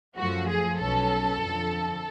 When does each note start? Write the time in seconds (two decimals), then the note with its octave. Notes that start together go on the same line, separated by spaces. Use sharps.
0.17 F#2 F3 A3 F#4
0.48 G#4
0.79 B1 B2 F#3 C#4 A4
1.40 F2 D3 F3